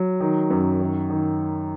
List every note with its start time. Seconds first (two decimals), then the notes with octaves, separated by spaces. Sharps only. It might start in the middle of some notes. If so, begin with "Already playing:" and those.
Already playing: F#3
0.20 D#3
0.50 F#2
0.81 D#3
1.10 D#3